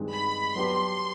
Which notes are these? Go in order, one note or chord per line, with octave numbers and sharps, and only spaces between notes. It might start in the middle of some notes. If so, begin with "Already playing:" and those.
Already playing: G2 D#3 G#3 C4 D#4
B5
F#3 B3 D4 G4 B4 C6